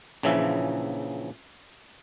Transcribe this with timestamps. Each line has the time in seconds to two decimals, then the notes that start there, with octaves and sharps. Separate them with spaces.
0.23 A#1 C#3 E3 F3 E5